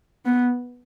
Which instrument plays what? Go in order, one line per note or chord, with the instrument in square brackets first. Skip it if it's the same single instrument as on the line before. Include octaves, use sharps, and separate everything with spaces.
[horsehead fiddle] B3